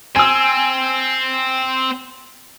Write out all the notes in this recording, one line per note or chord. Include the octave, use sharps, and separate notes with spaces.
C4 G#5 E6